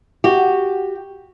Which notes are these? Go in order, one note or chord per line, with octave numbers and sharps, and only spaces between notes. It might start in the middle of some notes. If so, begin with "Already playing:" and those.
F#4 G4